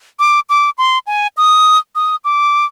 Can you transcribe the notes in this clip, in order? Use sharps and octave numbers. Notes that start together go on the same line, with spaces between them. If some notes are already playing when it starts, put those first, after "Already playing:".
D6
D6
C6
G#5
D#6
D#6
D6